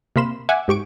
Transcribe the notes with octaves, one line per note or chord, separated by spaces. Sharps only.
C3 A#3 F5 B5 C6 E7
E5 F#5 G#5 D6 E6
G#2 G4 C#6 D7